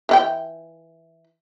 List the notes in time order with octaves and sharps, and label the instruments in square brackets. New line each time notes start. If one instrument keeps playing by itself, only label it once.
[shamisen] E3 E4 G5